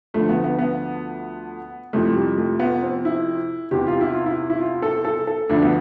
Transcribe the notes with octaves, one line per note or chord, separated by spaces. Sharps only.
D2 D3 F3 A3
B3
B3
B3
F2 C3 E3 A3
G3
A3
B3
C4
E4
E2 C3 E3 G4
F4
E4
F4
E4
E4
F4
A4
A4
A4
D2 D3 F3 D4
B3